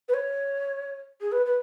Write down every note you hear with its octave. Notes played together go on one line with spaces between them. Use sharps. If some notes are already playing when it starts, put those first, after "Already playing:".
B4
C#5
G#4
B4
B4